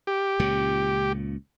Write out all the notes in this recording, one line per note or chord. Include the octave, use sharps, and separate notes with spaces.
G4
C#2 A#2 C#3